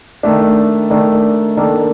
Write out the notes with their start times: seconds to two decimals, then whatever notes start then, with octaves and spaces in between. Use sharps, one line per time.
0.23 D#3 A3 D4
0.90 D#3 A3 D4
1.57 D#3 A#3 D4 A4